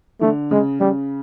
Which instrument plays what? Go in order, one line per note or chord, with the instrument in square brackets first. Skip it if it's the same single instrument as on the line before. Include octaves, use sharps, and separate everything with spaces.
[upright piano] D3 [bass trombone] A3
[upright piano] C#3 [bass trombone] G#3
[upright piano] C#3 [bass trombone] G3